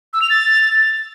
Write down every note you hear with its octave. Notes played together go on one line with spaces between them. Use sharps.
E6
F7
A6